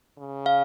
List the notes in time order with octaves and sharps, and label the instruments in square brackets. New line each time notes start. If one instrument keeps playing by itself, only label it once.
[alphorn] C#3
[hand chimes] F5